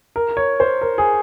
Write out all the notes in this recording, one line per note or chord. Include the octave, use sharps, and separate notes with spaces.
A#4
C#5
C5
A#4
G#4